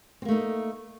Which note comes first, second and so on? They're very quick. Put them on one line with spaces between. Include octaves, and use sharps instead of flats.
C4 A#3 A3 D#4